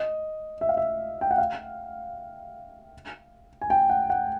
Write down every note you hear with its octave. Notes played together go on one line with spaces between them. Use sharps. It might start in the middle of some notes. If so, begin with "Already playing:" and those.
Already playing: D#5
E5
F5
E5
G5
F#5
F5
G#5
G5
F#5
F#5